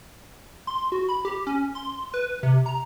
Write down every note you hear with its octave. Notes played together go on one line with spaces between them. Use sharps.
C6
F#4
B5
G4
C#4
C6
B4
C3
A#5